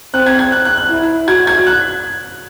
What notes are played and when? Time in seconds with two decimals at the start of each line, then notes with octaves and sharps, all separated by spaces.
0.14 C4 F#6
0.26 G#6
0.39 G#6
0.52 F#6
0.65 F#6
0.78 F#6
0.90 E4
1.28 F#4 G#6
1.47 G#6
1.67 F#6